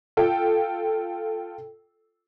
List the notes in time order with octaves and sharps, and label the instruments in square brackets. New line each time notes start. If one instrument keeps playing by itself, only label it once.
[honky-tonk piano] F4 A4 G5